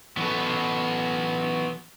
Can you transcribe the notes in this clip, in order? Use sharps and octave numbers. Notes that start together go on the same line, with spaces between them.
E3 F#3 B3 A4